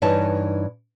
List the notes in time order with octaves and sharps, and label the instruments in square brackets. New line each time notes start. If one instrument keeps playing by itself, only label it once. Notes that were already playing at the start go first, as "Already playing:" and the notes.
[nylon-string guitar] G2 E3 D#4 C#5 A5